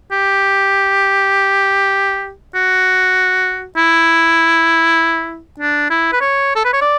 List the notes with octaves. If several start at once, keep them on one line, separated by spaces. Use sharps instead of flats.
G4
F#4
E4
D4
E4
B4
C#5
A4
B4
C#5
D5